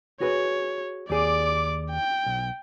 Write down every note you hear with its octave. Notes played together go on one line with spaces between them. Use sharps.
F#4 G#4 B4 C#5
D#2 G#4 D5 D6
G5
B1